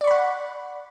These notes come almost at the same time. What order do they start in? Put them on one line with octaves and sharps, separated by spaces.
D5 C#6 B5 F#5